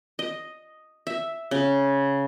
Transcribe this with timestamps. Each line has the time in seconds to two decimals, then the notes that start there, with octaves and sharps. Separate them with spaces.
0.19 D#5
1.07 E5
1.51 C#3